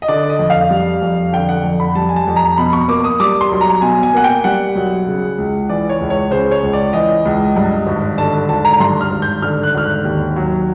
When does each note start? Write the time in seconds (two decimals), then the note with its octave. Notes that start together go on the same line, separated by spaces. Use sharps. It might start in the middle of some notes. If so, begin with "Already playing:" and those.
0.02 D#5
0.08 D3 D5
0.30 D#5
0.39 F2
0.50 F5
0.70 G3
1.02 F2
1.32 D3 G5
1.49 F#5
1.64 F2
1.80 B5
1.95 G3 A5
2.09 G#5
2.16 A5
2.27 F2
2.36 A#5
2.58 B2 B5
2.73 C#6
2.88 A#3 D6
3.04 D#6
3.20 G3 D6
3.41 C6
3.52 B1
3.61 A#5
3.82 B2 G#5
4.03 G#5
4.13 A#3 F#5
4.24 G5
4.44 G3 F#5
4.75 B1
5.07 C#3
5.38 C#2
5.69 E3 D5
5.89 C#5
6.01 C#2
6.10 C#5
6.31 C#3 C5
6.51 C#5
6.63 C#2
6.73 D5
6.93 E3 D#5
7.25 C#2
7.56 G2
7.86 G#1
8.18 D3 A5
8.49 G#1 A5
8.65 A#5
8.80 G2 C6
9.01 F6
9.11 G#1
9.22 G6
9.42 D3 F6
9.63 F#6
9.74 G#1 F6
9.84 F#6
10.04 D#2
10.36 F#3